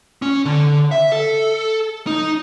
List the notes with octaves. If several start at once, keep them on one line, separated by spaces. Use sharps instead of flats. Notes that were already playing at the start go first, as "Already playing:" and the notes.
C#4
D3
E5
A4
D#4